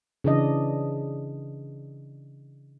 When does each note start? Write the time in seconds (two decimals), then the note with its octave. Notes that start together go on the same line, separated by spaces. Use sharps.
0.24 C#3 E3 D4 D#5